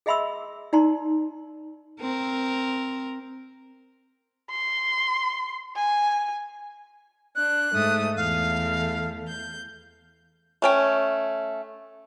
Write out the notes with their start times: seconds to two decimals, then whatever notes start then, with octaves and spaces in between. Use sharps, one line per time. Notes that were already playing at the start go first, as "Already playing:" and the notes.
0.06 G#4 D#5 E5 B5 C6 E6
0.73 D#4 D5 A#5 C6
2.01 C4 A#4
4.50 C6
5.76 G#5
7.36 D4 F#6
7.72 G#2 A3 D#6
8.16 E2 A3 F5
9.27 G6
10.62 A3 C#4 G5